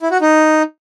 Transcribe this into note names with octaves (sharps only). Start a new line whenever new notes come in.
E4
F#4
D#4